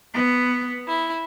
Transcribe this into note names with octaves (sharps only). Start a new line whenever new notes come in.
B3
E4